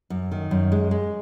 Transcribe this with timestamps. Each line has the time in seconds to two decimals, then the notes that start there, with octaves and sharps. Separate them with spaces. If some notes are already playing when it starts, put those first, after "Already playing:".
0.10 F#2
0.31 D#3
0.51 F#2
0.72 G#3
0.91 G#3